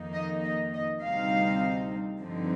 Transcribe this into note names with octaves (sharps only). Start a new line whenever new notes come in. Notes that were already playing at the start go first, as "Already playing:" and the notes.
Already playing: F2 D#3 A#3 D#4
D#5
D#5
D#5
D2 C3 G3 C4 D#4 F5
G2 D3 F3 C4 D#4